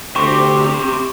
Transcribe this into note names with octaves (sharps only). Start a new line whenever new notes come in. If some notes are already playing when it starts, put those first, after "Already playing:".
D2 C3 G4 C#6